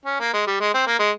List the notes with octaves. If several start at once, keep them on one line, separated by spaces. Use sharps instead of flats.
C#4
A#3
G#3
G3
G#3
C4
A#3
G#3